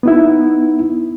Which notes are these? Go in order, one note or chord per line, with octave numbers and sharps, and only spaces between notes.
B3 D#4 E4